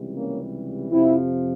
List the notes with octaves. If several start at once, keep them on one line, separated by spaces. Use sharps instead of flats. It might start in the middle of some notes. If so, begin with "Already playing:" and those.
Already playing: C#2 C3 E3 G3
A#3 C#4
F2 C3 F3 C4 E4